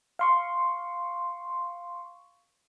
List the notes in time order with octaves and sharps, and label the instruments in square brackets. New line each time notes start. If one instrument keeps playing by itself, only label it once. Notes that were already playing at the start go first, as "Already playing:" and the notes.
[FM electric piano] F5 C6 C#6